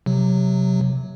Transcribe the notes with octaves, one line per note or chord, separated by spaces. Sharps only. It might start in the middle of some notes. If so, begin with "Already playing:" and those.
C3 F#3